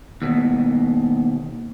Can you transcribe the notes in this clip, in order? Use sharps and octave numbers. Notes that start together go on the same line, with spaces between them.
D#2 B2